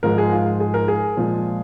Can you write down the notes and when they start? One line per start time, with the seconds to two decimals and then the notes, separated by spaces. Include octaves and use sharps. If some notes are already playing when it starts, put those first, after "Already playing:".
0.03 G#2 F3 G#3 A#4
0.18 G#4
0.32 F4
0.60 G#4
0.74 A#4
0.88 G#4
1.17 A#2 F3 G#3